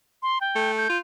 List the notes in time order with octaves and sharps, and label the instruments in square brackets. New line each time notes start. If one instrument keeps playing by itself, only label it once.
[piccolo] C6
G5
[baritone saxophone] A3
[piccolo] G6
[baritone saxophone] F4